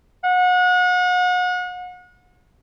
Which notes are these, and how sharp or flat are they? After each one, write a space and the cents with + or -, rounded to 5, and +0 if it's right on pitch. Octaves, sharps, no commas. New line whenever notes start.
F#5 -35